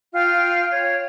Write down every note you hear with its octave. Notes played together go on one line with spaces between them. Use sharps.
F4 F5 G5 F6
C#5